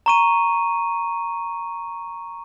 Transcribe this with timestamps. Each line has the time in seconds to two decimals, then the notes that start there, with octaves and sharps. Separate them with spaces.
0.06 A#5 C#6 D#7